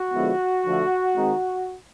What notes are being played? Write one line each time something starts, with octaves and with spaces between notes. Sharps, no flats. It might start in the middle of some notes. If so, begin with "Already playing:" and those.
Already playing: F#4
D3 F3 G#3 B3 E4
D3 F3 A3
D#3 G#3 C4 D#4